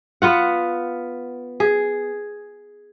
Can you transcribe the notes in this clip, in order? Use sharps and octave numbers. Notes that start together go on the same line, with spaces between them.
B3 F4 F#5
G#4